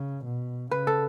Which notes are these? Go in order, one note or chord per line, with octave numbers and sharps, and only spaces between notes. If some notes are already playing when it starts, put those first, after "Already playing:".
Already playing: C#3
B2
C#3 B4
A4